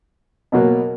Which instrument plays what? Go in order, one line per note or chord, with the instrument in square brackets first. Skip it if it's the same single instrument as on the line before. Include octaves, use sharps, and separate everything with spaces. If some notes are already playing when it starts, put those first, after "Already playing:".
[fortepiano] B2 F#3 A#3